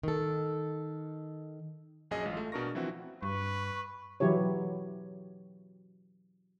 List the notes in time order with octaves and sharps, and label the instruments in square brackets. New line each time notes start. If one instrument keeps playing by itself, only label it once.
[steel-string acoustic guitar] D#3 A4
[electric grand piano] A#1 F#2 G#4 D#5
A1 G#3 F4
A3
B2 D4 A#4 C#6 A#6
E3 F3 C4 E4 F#4
[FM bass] G2 [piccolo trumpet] B4 [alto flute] C#6
[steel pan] E3 F#3 E4 G4 C#5